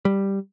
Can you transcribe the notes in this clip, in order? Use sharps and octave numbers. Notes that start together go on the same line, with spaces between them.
G3